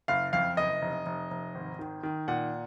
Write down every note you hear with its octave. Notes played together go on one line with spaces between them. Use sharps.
F#1 F5
F2 F5
F#1 D#5
F1
F1
F1
G#1
D#3
D#3
A#2 F#5